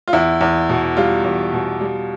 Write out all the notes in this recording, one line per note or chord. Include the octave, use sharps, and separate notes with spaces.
F4
E2 E4
E2
B2
G3 F4
E2
B2
G3